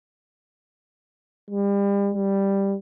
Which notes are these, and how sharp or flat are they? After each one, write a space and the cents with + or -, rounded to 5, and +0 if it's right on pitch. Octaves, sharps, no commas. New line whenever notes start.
G3 +35
G3 +5